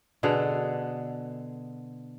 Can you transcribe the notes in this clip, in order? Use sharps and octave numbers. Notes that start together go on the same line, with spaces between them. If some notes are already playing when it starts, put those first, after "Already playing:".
B2 D3 G#4 A4